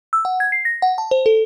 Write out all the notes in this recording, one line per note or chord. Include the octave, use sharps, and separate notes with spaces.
E6
F#5
G#6
C7
A#6
F#5
A5
C5
A4